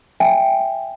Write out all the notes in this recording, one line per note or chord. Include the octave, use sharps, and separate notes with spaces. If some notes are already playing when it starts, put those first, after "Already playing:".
E5 G5 G#5